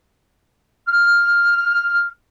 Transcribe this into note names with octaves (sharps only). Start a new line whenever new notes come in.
F6